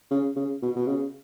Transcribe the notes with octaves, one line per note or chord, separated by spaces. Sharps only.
C#3
C#3
B2
B2
C#3